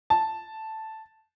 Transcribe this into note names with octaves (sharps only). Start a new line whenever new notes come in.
A5